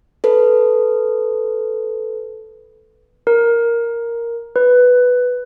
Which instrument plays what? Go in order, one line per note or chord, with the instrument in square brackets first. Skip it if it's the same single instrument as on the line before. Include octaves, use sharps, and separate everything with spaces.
[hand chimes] A4 B4
[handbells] A#4
B4